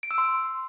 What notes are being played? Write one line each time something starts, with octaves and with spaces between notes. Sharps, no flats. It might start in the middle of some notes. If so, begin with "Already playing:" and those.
D7
E6
C6